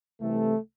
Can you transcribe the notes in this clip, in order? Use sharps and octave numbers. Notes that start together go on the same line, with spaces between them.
C2 C3 E3 A3